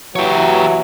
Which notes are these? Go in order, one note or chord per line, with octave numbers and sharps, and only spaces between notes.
E3 F#3 G4 C#5